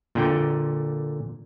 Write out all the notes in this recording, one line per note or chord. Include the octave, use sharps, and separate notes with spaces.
A#2 D3 G5